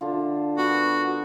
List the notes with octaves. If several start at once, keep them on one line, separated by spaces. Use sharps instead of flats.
D3 D4 F4
B3 F#4